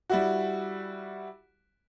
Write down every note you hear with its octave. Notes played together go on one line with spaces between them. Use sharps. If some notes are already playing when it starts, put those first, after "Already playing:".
G3 E4 F#4